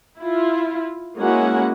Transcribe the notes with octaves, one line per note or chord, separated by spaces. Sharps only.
E4 F4
G#3 A#3 C#4 E4 F#4 F#5